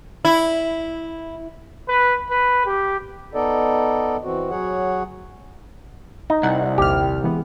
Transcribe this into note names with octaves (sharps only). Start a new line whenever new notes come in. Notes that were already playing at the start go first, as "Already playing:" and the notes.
E4
B4
B4
G4
B3 D#4 A4 D5 D#5
E3 C4 F#4
F#3 G#4 C#5 F#5
D#4
C2 F#5
A#1 D#2 G4 F6
E3 G#3 B3